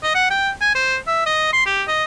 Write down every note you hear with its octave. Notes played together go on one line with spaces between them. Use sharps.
D#5
F#5
G5
G#5
C5
E5
D#5
C6
G4
D#5